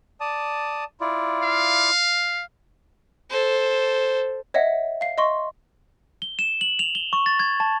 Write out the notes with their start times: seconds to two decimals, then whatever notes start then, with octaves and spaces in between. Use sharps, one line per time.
0.20 D5 A5 D#6
1.01 E4 F4 D5
1.43 F5
3.30 A4 C5
4.54 C#5 D#5 E5 F#5
5.01 F5 C7
5.18 D#5 C6 C#6
6.22 G7
6.39 E7
6.61 F#7
6.79 F7
6.95 G7
7.13 C#6
7.26 A6
7.40 G#6
7.60 A5